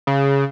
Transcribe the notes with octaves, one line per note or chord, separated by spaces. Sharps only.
C#3